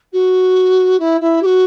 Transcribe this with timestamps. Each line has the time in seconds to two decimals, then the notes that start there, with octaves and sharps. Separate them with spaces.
0.12 F#4
0.99 E4
1.20 E4
1.42 G4
1.45 F#4